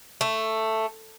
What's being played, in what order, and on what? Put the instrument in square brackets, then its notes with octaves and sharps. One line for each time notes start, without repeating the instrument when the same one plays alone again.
[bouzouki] A3